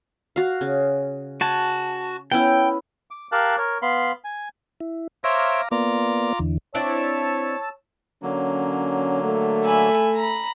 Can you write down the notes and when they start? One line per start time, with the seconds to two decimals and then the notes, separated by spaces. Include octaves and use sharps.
0.36 F#4 F5
0.61 C#3
1.41 F#4 G#5 A5
2.32 B3 C#4 E4 G5
3.11 D6
3.32 G4 A#4 F5 A5 F#6
3.58 A#4 C#5
3.82 B3 F5 B5 C6
4.24 G#5
4.80 E4
5.24 C5 C#5 E5 F5 A#5 D6
5.72 A#3 B3 F4 D5 A#5 D6
6.39 E2 D3 E3
6.75 C4 D4 E4 C#5 A5 E6
8.23 D3 F#3 A#3 C#4
9.23 A3
9.63 E5 G#5 B5
10.16 A#5 B5